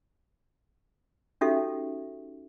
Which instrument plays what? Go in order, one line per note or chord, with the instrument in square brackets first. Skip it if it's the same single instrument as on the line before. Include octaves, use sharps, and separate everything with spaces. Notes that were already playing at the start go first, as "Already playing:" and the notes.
[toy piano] C#4 D#4 F#4 G4 A4 E5